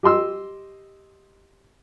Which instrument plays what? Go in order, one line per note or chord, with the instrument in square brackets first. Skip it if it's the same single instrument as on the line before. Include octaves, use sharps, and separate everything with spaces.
[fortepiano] G4 D#5 C6 E6